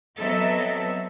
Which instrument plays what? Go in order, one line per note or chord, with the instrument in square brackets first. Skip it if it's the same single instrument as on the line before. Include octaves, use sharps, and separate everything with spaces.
[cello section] F#3 B3 C4 A4 D#5 E5